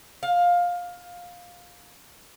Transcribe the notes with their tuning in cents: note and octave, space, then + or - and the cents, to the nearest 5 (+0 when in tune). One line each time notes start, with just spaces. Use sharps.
F5 +15